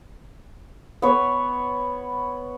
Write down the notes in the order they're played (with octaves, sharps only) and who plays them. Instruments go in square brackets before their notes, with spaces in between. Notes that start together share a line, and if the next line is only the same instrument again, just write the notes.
[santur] B3 C#5